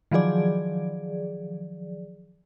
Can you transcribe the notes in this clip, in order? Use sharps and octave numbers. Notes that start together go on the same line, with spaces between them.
D#3 F3 F#3 G#4 D5